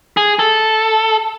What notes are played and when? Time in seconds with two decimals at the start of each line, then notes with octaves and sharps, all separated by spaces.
0.17 G#4
0.39 A4